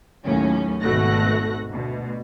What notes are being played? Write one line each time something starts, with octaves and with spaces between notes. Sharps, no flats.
D#2 A2 F#3 C#4
G#1 B2 A3 F#4 F#6 A#6
D2 B2